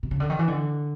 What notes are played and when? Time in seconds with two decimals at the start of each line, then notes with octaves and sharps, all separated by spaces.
0.03 C3
0.11 C#3
0.20 D3
0.30 D#3
0.39 E3
0.48 D3